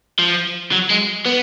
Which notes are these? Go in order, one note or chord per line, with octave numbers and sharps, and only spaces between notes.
F3
F#3
G#3
B3